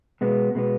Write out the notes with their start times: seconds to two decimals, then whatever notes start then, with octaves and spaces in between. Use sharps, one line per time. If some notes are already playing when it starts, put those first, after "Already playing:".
0.21 B2 G#3 B3
0.55 B2 G#3 B3